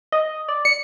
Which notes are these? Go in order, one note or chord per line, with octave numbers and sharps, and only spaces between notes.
D#5
D5
C#7